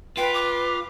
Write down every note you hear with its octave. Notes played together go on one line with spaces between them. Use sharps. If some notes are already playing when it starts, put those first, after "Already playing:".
F4 B4 G5
D6